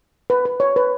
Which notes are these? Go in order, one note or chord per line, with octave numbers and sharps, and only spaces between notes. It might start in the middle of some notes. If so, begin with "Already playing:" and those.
B4
B4
C#5
B4